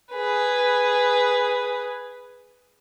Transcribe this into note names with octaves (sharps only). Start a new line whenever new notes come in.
G#4 B4